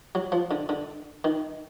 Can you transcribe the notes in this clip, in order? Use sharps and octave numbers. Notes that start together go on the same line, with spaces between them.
F#3
F3
D3
D3
D#3